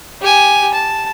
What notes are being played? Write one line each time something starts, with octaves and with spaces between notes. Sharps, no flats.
G4 G#5
A5